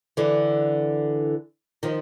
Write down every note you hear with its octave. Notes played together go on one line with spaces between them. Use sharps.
D3 E3
D#3 F3